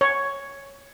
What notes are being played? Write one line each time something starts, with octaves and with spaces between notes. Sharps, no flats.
C#5